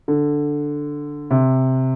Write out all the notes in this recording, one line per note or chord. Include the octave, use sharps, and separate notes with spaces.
D3
C3